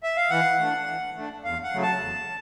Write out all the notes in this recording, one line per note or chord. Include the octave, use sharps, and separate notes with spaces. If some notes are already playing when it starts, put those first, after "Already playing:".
E5
F5
E3 F#5
A3 D4
E3
A3 D4
E2 F5
F#5
C#3 F#3 A3
A5
E2